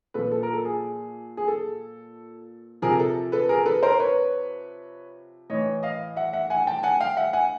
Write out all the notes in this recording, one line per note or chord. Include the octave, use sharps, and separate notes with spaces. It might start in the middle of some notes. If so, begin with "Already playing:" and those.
A#2 F3 A4 B4
A4
A#4
A4
G#4
G#4
A4
C3 F3 G#4 A#4
A4
A4 B4
G#4 A#4
A4 B4
A#4 C5
B4 C#5
A2 E3 C#5 D#5
D#5 F5
E5 F#5
E5 F#5
F#5 G#5
G5 A5
F#5 G#5
F5 G5
E5 F#5
F#5 G#5